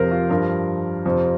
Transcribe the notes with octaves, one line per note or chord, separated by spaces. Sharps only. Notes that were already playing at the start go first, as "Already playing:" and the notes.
Already playing: F2 C3 F3 A#4 C5
F4
G2 F3 A#4
F2 C3 F3